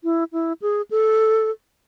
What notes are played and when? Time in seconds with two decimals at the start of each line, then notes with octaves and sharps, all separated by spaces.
0.04 E4
0.33 E4
0.62 G#4
0.91 A4